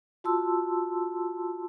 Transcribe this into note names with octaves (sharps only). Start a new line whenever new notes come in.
F4 F#4 A5 C6 E6